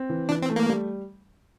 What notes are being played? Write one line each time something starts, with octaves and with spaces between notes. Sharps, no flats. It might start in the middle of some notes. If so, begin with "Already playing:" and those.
Already playing: C4
E3
E3 D4
C4
A3
A#3
G3